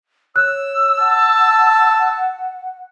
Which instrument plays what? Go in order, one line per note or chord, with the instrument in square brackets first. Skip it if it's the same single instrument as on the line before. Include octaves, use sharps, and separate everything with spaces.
[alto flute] C#5 [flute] E6 [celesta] F#6
[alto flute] F#5 [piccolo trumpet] A5